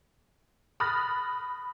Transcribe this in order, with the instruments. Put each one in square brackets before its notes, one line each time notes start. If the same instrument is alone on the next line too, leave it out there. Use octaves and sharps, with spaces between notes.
[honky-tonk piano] B5 D#6 F6 F#6 A6 A#6